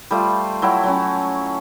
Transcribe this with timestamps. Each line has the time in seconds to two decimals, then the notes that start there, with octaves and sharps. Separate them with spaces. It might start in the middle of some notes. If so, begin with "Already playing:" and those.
0.11 G3 A3 F4 C5
0.62 F#3 E4 G5 A5
0.84 F#3 C#4